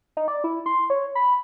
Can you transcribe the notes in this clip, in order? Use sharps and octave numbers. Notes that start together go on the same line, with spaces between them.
D#4
D5
E4
C6
C#5
B5